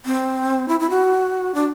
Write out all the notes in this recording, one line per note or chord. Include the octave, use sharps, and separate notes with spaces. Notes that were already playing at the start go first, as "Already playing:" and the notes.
C4
E4
E4
F#4
D4